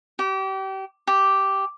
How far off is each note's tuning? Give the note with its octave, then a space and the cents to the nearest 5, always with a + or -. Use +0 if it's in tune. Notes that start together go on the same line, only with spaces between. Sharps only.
G4 -30
G4 -5